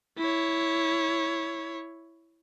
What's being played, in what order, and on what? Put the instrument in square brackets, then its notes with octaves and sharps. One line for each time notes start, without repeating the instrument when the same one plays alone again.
[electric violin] E4 C#5